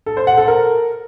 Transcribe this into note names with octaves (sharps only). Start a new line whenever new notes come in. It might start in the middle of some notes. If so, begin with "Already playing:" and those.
A4
C5
F#5
A4
A#4